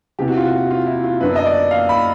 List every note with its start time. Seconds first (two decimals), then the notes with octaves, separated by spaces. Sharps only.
0.19 E2 C3 E3 G4
0.28 F#4
0.37 F4
0.45 F#4
0.71 F4
0.86 E4
1.04 F4
1.21 F#2 D3 F#3 B3 D4 B4
1.36 D#5
1.46 D5
1.71 F5
1.89 B5